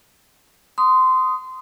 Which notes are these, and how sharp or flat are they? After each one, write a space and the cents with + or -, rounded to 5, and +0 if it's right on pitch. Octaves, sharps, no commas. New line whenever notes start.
C6 -20 D#6 +0